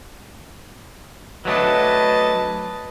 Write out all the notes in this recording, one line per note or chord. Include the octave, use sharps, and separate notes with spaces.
F#3 A3 D4 B4 D#5 A5